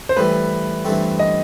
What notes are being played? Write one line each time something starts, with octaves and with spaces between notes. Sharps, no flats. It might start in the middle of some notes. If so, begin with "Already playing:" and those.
C5
A2 E3 G3 B4
G2 E3 A3 C4
D#5